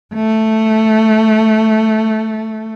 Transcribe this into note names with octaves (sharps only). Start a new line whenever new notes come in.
A3